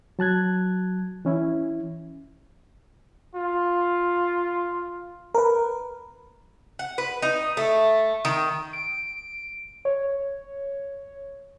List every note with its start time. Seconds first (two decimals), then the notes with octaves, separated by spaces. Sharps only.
0.19 F#3 A5 F#6 G#6
1.25 E3 C#4 E4
3.35 F4
5.35 A#4 B4
6.79 F#5
6.98 B4
7.22 D#4
7.57 A3
8.25 D#3
8.73 D7
9.85 C#5